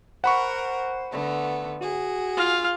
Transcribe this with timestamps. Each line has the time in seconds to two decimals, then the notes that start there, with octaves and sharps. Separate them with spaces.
0.24 A#4 C5 F#5 B5 C#6
1.11 D3 A3 B3
1.81 F#4 G#4
2.37 F4 F5